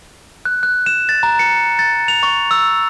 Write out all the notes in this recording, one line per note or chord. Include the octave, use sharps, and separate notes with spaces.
F#6
F#6
E7
A6
A#5
C#7
A6
F7
C#6
E6